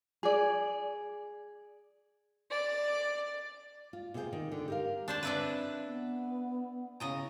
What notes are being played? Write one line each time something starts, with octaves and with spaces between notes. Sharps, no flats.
G#4 D5
D5
F4
C3 F4 G#4 B4 G5
D#3
D3
G4 A#4 F5
D4 C5 A5
C4 D4 E4 B4
B3
C#3 E4 D#5 A#5